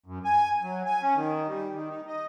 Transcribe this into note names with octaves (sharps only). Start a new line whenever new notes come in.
F#2
G#5
F#3
G#5
C#4
D#3
G3
D#3
D#4
D#5